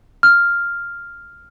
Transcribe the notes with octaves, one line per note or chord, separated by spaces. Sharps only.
F6